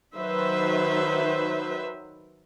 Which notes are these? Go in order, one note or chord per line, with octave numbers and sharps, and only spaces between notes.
D#3 F#3 B4 C5 E5